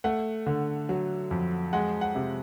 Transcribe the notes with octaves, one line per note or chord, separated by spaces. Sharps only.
A3 F#5
D3
F#3
F2
G#3 F#5
F#5
C3